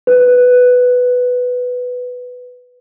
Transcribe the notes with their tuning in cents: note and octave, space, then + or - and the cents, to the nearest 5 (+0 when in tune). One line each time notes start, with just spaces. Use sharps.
B4 +5